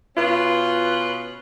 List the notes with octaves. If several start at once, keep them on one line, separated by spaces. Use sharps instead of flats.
B2 C#4 F4 B4